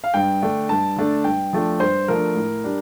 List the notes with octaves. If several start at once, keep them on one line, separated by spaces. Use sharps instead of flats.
F5
G2 G5
D3 A3 D4
G2 A5
D3 A3 D4
G2 G5
F3 A3 D4
G2 C5
F3 A3 D4 A#4
A2
G3 D4